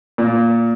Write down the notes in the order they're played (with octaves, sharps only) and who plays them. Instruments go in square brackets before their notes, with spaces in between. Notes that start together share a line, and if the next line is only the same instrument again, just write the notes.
[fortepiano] A#2